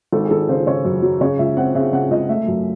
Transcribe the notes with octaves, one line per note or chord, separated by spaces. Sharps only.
G#1 A4
G#4
G#1 A4
C#3 C5
C#3 C#5
F#2
F#3
C#3 C#5
C#2 E5
C4 F#5
C#3 E5
C#3 F#5
C#2 D#5
A3 E5
F#2